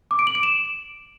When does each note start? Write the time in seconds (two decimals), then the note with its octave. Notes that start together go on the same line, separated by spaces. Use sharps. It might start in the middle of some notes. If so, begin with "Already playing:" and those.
0.11 D6
0.19 D7
0.27 F#7
0.35 D7
0.43 E7